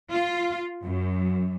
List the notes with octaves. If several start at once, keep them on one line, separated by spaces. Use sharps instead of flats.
F4
F#2